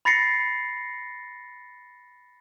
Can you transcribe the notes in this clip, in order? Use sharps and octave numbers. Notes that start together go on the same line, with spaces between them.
B5 A6 A#6 C7 C#7